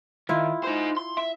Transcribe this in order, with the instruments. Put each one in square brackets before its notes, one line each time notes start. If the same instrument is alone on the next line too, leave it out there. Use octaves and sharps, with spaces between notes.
[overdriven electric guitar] D#3 [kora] E4 F4
[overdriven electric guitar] D#4 C5
C6
E5